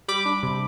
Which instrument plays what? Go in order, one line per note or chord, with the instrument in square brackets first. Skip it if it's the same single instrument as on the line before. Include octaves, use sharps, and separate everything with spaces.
[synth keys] G3 B5 D6
D4
C3